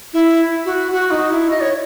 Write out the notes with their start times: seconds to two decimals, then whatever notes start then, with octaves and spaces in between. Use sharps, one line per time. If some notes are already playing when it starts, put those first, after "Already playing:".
0.13 E4
0.65 F#4
0.92 F#4
1.11 D#4
1.30 E4
1.50 D#5
1.61 C#5